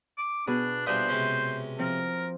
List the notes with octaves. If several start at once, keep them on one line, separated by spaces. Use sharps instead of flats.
D6
B2 B3 D4 G#4
A#2 G3 D4 C5 E5 D#6 F#6
C3 G#3 C#4
F3 C4 A#4